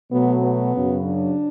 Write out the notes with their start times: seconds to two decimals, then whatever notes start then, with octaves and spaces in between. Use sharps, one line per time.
0.11 B2 F#3 A3 B3
0.42 B3
0.74 F#2 C#3 F#3
1.05 D4